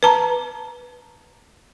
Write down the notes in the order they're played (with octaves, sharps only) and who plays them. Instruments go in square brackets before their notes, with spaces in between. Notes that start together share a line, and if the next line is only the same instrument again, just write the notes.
[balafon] B4 A5 A#5